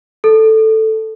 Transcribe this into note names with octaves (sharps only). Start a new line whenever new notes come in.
A4